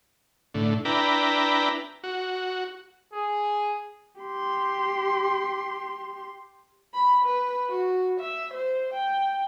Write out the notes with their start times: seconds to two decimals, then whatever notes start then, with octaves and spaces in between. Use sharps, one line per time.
0.54 A2 D3
0.85 D4 E4 B4 G5 A#5
2.04 F#4
3.13 G#4
4.22 G4 C6
6.94 B5
7.25 B4
7.69 F#4
8.20 E5
8.54 C5
8.93 G5